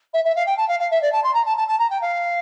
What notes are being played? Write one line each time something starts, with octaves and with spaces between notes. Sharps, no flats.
E5
E5
F5
G5
A5
F5
F5
E5
D5
A5
C6
A#5
A5
A5
A5
A#5
G5
F5